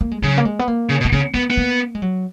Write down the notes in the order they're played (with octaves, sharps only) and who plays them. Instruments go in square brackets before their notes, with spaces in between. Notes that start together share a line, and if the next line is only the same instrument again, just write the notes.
[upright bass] A#3
G#3
[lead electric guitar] C#3 [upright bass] F#3
[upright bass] A#3
G#3
B3
A#3
[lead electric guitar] C#3
B2
[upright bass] A#3
[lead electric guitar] C#3 [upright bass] B3
[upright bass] A#3 [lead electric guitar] B3
[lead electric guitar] B3
[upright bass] A#3
G#3
F#3